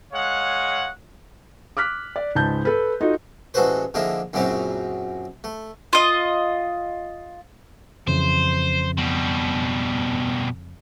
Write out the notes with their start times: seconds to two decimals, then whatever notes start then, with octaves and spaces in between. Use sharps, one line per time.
0.13 G#3 C#5 F5 F#5
1.77 D6 F6 F#6 B6
2.16 D5
2.35 C#2 G#2 A5 G6
2.65 A4 B4
3.01 D#4 F4 F#4 A4 D#5
3.54 A1 G#3 F#4 A4 B4 C5
3.94 D3 F3 G#3 A#3 E4
4.33 F#2 A#2 C#3 F#3 C4 E4
5.44 A3
5.93 F4 D#5
8.08 F2 C#3 E3 C5
8.97 B2 G3